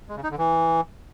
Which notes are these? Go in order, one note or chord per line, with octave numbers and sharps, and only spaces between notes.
G#3
C#3
D#4
D3
E3